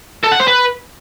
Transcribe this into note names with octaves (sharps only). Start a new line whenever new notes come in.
A4
F#5
C5
B4